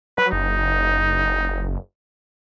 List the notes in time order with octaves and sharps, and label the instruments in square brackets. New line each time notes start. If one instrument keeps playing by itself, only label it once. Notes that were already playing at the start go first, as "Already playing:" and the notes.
[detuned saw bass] F#3 [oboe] B4
[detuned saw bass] F#1 [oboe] D#4